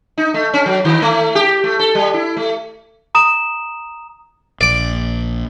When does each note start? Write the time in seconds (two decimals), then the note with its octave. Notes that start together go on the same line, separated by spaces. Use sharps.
0.18 D#4
0.34 A3
0.54 C#4
0.66 F#3
0.85 D#3
1.02 A3
1.35 G4
1.64 A3
1.79 A4
1.95 G3
2.14 E4
2.37 A3
3.15 A#5 D#6 E7
4.61 A#1 D5 D6